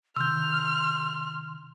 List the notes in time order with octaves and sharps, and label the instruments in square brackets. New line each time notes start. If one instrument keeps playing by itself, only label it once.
[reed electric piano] C3 D#3 [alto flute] C6 [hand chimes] E6 G6 [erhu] F6